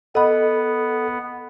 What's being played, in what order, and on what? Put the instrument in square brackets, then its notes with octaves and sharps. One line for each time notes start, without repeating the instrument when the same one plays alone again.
[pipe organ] B3 [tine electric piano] A4 F#5 [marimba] D#5 B5